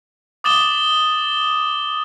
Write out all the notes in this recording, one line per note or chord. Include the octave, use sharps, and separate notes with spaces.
D6 D#6 A6 E7 G7